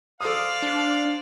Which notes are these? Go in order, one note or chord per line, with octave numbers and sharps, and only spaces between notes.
A4 C5 D5 F5 D#6
D4